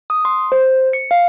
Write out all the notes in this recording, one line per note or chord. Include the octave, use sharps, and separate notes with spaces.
D#6
C6
C5
C#7
F5